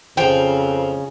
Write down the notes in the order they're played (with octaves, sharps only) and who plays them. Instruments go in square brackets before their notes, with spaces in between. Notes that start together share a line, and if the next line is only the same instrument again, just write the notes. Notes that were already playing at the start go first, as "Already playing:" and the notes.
[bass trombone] F2 [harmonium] C#3 [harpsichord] F3 [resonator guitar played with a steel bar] G5